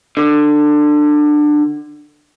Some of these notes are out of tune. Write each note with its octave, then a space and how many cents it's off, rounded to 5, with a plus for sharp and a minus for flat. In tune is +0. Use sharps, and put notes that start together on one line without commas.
D3 +20